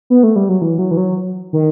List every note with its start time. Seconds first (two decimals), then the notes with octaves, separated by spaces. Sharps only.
0.10 B3
0.23 A3
0.36 G3
0.49 F#3
0.62 E3
0.79 F#3
0.91 E3
0.97 F#3
1.53 D#3